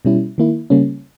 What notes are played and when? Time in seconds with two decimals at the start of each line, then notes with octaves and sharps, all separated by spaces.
0.05 B2 G3 C#4 E4
0.38 D#3 A#3 E4
0.70 C#3 G3 A#3 C#4